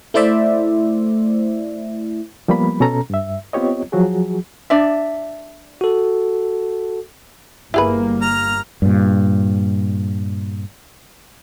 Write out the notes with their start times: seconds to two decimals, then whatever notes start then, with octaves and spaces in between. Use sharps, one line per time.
0.14 A3 E4 C5 D5 E5
2.48 F3 G3 A#3 B3 B5
2.80 B2 C#4 A4 A#5
3.10 G2 E5
3.53 B3 C4 F4 G4 C#5 D#5
3.92 F3 F#3 F#4 G#4
4.70 D4 D5 E5
5.81 F#4 A4
7.74 G1 G3 A#3 E4 G#4 B4
8.21 A#5 F6
8.82 G2 A#2